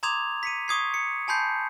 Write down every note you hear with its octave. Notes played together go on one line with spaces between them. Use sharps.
A#5 C6 D6 D#6 G#6 F7
B6 C#7 D#7
C#6 D#6 G#6 C7
C#7
G#5 A5 B5 C6 G6 C7